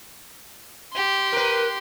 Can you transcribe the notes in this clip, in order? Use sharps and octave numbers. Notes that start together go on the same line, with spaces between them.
G4 C6
A#4 B4